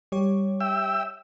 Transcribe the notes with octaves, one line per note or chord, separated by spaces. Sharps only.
G3 G4 C#5
E5 G5 E6